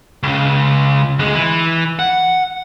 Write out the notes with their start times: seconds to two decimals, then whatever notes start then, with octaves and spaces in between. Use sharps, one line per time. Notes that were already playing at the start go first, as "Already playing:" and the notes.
0.23 C#2 C#3
1.19 D2 G#3
1.35 E3
1.99 F#5